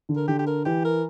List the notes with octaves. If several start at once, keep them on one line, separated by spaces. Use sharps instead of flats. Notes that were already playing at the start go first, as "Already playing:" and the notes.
D3
A#4
D3 G4
G4
A#4
E3 G4
A#4